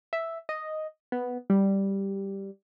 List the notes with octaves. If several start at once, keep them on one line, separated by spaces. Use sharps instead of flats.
E5
D#5
B3
G3